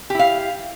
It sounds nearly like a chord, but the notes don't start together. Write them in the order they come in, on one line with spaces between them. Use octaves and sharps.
G4 E4 F5